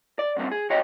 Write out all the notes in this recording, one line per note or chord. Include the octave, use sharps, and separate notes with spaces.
D5
F#2 A#2 G3 C4
G#4
C2 F#4 C#5 D#5 G5